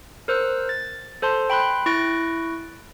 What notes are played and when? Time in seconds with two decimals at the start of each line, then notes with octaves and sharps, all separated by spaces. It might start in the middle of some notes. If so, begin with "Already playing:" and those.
0.28 A#4 C5 E6 F#6
0.69 A6
1.22 A4 C5 A5 C6
1.50 G5 B5 C6 F#6
1.86 E4 C#6 F#6 A6 A#6 D7